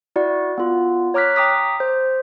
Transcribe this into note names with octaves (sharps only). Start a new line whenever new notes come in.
E4 F#4 D5 F#5
B3 F4
C#5 A#5 D6 F6 F#6 B6
G5 A#5 D6 D#6 B6
C5